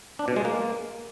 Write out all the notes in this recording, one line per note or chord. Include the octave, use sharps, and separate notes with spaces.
D4
B2
G#3
A#3